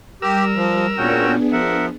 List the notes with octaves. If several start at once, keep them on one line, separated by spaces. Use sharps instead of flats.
G3 G4 A#4 E6
F3
A#2 B3 C#4 D4 F#4 G#4 G5
F3 A#4 E5 F#5